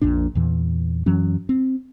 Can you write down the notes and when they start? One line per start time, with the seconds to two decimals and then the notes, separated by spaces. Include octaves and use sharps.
0.02 A#1 F2 A#2 D4
0.35 E2 A#2 E3
1.06 F#2 E3 F#3 C#4
1.49 C4